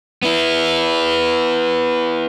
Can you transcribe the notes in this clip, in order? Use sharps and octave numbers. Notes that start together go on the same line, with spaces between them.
B3 E4